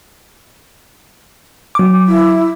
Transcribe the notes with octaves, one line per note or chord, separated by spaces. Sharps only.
F#3 D6
E4